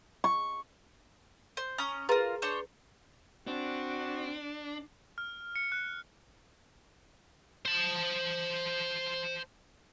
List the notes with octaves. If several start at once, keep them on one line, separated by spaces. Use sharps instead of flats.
C#6
C5
C#4 A#5 D#6
F4 G#4 A#4 B4 A#5
D4 C5 C#5
C4 D4 F#4
F6
C#7
F#6
C5 A5